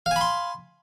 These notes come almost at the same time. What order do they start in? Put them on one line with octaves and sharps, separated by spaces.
F5 G#5 B5 C6